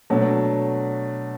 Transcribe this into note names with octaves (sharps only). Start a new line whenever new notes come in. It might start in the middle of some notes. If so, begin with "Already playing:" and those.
B2 F#3 A3 D4